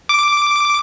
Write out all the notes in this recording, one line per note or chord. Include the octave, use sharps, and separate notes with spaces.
D6